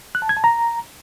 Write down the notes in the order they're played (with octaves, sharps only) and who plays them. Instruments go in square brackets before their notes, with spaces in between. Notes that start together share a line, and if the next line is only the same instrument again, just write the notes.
[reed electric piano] F#6
A5
G#6
A5
A#5